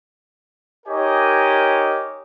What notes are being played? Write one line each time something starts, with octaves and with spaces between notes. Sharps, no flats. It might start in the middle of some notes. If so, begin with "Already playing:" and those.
D#4 G4 A#4 C#5 D#5 G#5